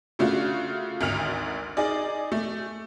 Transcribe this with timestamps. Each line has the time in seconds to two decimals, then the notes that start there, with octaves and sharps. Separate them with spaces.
0.19 C#3 A3 D4 F4 F#4
1.01 G#1 D2 F6 F7
1.77 D#4 G#4 D5
2.32 A3